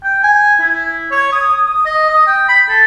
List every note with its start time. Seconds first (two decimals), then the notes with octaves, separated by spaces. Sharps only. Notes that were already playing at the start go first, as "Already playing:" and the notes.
0.03 G5
0.23 G#5
0.60 E4
1.12 C#5
1.32 D#6
1.49 D#6
1.66 D#6
1.86 D#5
2.09 D#6
2.27 G5
2.49 B5
2.69 A4